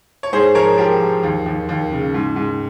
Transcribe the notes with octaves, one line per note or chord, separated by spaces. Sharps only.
C#5
G#2 G#4 C5
F3 A#4 C#5
F3 G4 A#4
F3
D#2
D#2
D#2
C#3
G#2
G#2